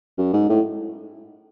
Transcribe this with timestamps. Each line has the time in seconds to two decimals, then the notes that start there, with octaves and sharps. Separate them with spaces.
0.18 F#2
0.33 G#2
0.49 A2